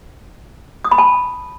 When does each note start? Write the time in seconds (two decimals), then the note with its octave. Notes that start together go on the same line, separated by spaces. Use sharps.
0.85 D#6
0.91 B5
0.98 A5